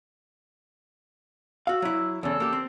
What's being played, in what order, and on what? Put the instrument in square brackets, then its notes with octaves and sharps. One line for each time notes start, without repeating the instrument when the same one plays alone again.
[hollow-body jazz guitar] F#4 F5 [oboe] E6
[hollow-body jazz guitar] F#3 E4
[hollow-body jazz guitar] E2 C#3 [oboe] A4
[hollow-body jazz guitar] A#3 G4
C4